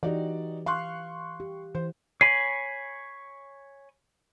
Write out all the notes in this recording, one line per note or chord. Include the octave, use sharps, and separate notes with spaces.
E3 D#4 F#4 G4 D5
F5 C6 C#6 F#6
G4
E3 C5
C#5 G#5 B5 C7